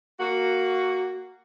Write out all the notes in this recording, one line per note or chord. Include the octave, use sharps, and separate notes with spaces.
A#3 F#4